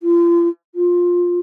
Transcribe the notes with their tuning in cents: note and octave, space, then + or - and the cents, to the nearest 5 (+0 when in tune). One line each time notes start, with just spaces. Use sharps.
F4 -35
F4 +15